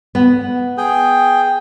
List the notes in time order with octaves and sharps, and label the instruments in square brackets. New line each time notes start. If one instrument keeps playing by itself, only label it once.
[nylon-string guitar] B3
[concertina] G#4 G5